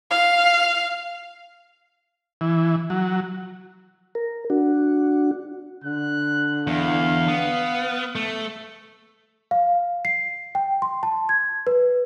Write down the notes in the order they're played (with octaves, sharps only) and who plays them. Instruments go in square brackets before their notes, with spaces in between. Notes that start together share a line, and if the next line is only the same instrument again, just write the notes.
[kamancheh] F5
[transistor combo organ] E3
F#3
[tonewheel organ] A#4
D4 F#4
[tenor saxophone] D3 [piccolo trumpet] F#6
[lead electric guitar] E2 [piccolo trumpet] F5
[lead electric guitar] B3
A3
[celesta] F5
C7
G5
C6
A5
G#6
B4